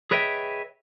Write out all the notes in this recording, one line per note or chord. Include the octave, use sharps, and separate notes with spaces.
G#4 B4 C#5 D#5 E5 G5